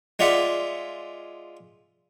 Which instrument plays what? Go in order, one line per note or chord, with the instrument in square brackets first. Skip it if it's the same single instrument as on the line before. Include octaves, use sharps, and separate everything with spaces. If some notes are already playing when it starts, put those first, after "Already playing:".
[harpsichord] G#3 F4 D5 E5 F#5